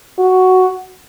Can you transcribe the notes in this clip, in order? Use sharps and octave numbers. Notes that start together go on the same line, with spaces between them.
F#4